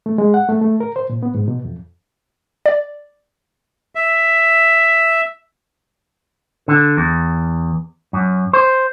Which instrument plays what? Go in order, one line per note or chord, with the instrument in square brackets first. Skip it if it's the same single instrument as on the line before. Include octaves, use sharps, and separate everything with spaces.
[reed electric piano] A3
G#3
F#5
A3
A3
A#4
C5
A#2
B3
G#2
B2
F2
[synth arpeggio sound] D5
[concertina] E5
[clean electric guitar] D3
E2
F#2
C5